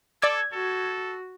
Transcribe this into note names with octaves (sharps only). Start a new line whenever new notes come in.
A4 D5 D6 E6 G#6
F#4 A4